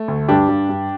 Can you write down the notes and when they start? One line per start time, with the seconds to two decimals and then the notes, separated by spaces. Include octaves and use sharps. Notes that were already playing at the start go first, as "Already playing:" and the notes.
Already playing: A3
0.08 D2
0.28 G2 D4 G4
0.49 G2
0.69 G2